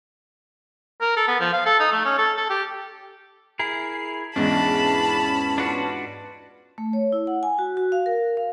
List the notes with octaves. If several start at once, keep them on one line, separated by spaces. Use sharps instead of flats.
A#4
A4
B3
F3
F5
A4
D#4
A3
C#4
A4
A4
G4
E4 G#4 A#4 C7
E2 G#2 E3 C#4 D4 A5 B5
D4 F4 F#4 B4
A3
C#5
E4
F#5
G#5
F#4
F#4
F5
A#4
F5